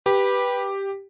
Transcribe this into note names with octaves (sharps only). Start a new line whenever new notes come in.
G4 B4